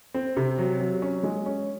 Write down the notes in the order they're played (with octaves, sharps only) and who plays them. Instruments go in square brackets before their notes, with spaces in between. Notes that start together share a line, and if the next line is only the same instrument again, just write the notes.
[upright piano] C4
C3
F#3
F#3
C#4
G#3
C#4